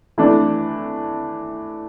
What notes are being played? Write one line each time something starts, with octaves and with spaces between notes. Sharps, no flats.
E3 A3 D4